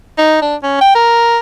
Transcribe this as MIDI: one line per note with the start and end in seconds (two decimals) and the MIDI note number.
0.18 0.38 63
0.42 0.56 62
0.63 0.80 61
0.81 0.94 79
0.95 1.39 70